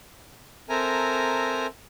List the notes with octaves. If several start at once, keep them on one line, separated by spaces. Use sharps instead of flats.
C4 A4 A#4 E5 G#5 A#5